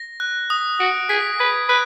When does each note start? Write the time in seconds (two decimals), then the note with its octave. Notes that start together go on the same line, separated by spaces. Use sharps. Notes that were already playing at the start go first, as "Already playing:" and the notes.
Already playing: A#6
0.20 F#6
0.50 D#6
0.80 F#4 D7
1.09 G#4 B6
1.39 B4 G#6
1.69 B4 F#6